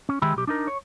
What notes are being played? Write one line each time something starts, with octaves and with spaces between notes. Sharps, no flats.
C#4
D#3 G#3 G4 E5 B5
B1 G4
D4 D#4 A#4
C#5